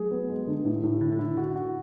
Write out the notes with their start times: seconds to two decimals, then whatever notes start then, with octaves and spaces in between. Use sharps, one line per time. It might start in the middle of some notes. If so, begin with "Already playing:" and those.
Already playing: F#3 A3 G#4
0.11 B3
0.29 G#3
0.47 D3
0.65 A2
0.83 A2
1.01 D3 E4
1.13 D3
1.19 E4
1.37 D3 F#4
1.56 F#4